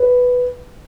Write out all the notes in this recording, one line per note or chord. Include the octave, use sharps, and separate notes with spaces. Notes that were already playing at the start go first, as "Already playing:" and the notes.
Already playing: B4